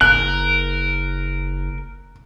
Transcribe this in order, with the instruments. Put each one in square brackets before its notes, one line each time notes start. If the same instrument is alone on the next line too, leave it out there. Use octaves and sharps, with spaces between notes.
[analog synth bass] F#1 [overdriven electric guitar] A#4 [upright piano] F#6